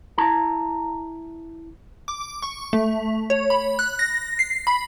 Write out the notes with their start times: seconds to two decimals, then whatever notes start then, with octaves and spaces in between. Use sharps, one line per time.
0.18 E4 A5 A#5
2.08 D6
2.42 C#6
2.73 A3
3.30 C#5
3.50 B5
3.79 F#6
3.99 A#6
4.39 C7
4.67 B5